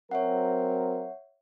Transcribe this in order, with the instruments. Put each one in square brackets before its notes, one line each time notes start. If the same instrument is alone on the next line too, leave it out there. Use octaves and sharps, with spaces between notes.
[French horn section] F#3 C4 A#4 [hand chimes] C#5 E5 F#5